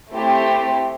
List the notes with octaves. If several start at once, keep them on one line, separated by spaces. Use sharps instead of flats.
A3 C4 E4 G4 C5